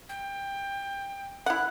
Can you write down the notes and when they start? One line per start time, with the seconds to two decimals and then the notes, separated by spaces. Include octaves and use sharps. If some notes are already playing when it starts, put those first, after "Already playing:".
0.09 G5
1.46 E4 F#5 F#6